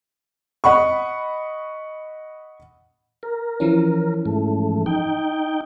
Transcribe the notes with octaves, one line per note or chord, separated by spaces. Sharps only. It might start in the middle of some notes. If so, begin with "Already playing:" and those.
D#5 F#5 B5 C#6
A#4
E3 F3 C#4
G#2 A3
D#4 G5